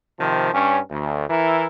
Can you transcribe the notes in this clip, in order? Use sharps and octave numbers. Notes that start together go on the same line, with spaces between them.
C3 D#3 F3
G2 C#4
D2
E3 E4 A#4